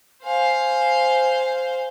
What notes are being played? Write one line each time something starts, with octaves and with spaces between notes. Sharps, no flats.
C5 F5 G#5